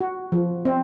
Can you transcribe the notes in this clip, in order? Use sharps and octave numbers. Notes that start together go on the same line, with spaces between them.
F#4
F3
C4